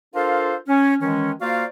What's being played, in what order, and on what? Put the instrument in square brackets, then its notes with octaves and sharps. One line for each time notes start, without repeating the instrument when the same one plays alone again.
[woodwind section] D4 F4 A4 A#4 C5 F5
C#4
D#3 E3 G#3 C#4
A#3 F4 F#4 C5 D5 F5